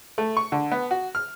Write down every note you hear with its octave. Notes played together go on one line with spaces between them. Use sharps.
A3
C#6
D3
B3
F#4
F6